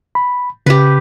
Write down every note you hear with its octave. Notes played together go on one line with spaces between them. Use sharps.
B5
C#3 G4 B4